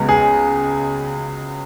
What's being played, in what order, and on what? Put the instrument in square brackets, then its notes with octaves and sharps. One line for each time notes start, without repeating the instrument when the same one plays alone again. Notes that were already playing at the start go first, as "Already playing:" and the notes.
Already playing: [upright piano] C#2 C#3 G#3 B3 F#4
[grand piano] G#4